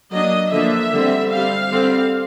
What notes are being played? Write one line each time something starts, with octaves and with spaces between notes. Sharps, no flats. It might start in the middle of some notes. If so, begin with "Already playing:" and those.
F#3 A#3 D4 D#5
D3 F3 A#3 D4 E5
D3 G3 C4
G3 C4 F5
D3 G3 C4